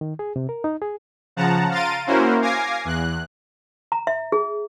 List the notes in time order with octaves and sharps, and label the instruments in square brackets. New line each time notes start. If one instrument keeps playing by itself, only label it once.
[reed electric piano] D#3
G#4
C3
A#4
D#4
G#4
[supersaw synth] C#3 F3 F#5 A5 A#5
F5 A#5 C6 A6 D7 D#7
A#3 C#4 E4 F#4 A#4 C5
F5 G#5 D6 G#6 A#6 C7
E2 F#6
[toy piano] A#5
E5
G#4